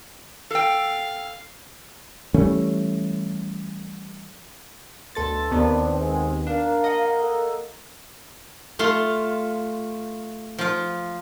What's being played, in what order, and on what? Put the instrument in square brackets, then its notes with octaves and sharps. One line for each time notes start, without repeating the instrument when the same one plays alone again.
[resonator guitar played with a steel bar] A4 G5 [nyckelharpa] F5
[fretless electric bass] E3 G3 A3 C#4
[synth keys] D2 A4 A6 [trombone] B2 [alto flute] C6
[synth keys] D#2 D#3 B3 [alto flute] C4 [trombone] D4
[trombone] G#3
[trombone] A#3 [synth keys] D4 [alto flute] F5
[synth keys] D#5 F#5
[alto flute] A4
[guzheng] A3 F4 C6
F3 F4